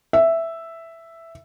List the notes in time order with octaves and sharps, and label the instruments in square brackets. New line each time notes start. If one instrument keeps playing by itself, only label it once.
[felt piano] E5